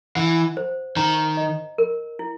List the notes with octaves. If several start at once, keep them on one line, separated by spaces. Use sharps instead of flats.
E3 F#5
C5
D#3 A#5
D#5
A#4
E4